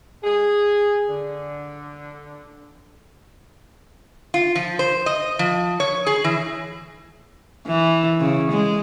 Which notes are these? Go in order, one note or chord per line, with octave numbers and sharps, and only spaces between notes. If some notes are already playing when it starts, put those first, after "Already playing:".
G#4
D3
F4
F3
C5
D#5
F3
C#5
G#4
E3
E3
C#3
G#3